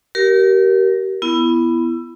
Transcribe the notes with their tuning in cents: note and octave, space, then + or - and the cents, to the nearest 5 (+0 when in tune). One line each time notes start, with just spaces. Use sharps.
G4 -30 A#4 +10
B3 +0 E4 +20